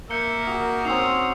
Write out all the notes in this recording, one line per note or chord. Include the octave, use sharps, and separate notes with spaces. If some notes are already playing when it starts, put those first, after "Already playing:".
A#3 A#4 E5 G6 C#7 G7
F#4 G#4 D#6
C4 C#4 D#4 D#6 E6 C7 F7